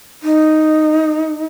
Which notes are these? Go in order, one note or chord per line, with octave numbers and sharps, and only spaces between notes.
D#4